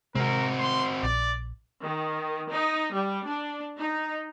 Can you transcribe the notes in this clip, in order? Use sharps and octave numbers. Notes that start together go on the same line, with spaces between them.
C3 G#3 C4 F#4 A#4
C6
A#1 D5
D#3
D#4
G3
D4
D#4